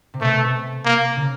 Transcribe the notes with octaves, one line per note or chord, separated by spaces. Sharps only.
C3
B2 A3
C3
A#3
C#3